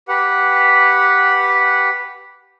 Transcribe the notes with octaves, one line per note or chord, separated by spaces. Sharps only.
G4 B4 F#5